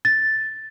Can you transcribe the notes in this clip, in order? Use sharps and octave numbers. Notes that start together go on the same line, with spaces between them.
A6